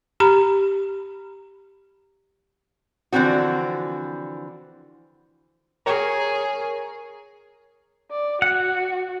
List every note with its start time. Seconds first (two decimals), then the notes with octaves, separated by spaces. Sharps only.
0.20 G4 A#5 B5
3.12 D3 E3 F3 C4 F#4
5.86 G#4 A#4 C#5
8.11 D5
8.42 F#4 F#5